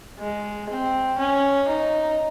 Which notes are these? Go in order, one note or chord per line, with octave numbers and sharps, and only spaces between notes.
G#3
C4
C#4
D#4